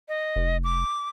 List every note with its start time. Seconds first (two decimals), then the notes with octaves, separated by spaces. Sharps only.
0.08 D#5
0.36 F1
0.64 D6